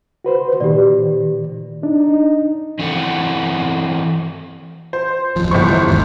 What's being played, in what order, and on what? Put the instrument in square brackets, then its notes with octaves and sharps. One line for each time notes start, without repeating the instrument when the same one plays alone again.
[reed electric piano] F#4 B4 C5
[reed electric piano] A#2 D#3 [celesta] G4 D5
[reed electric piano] D4 [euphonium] D#4
[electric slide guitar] E3 C4 E4 F#4 A4 F#5
[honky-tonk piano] C5
[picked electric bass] D1 F2 F3
[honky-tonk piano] G1 C5 C#6 [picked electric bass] G2 E3
[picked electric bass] G#1 D#2 G#2